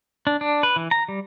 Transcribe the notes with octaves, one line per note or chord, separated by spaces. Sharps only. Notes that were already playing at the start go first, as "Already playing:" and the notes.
D4
D4
B4
E3
A#5
G3